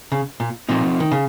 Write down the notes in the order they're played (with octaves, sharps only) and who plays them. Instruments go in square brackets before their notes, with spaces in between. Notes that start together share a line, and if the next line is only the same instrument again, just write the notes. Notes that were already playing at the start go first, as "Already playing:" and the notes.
[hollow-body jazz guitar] C#3
A#2
[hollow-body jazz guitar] A#2 [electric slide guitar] F3 A3 C4 D#4
[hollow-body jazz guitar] D#3
C#3